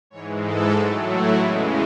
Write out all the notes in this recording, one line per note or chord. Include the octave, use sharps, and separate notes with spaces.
G#2 E3 G#3 C#5
A4
A2 F#3 A3
E4
E2 C#3 E3 G#3 G#4